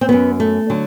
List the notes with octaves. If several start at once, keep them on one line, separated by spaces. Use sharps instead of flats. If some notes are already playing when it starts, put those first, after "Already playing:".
C4
F#2 F#3 B3
A3
D3 F#3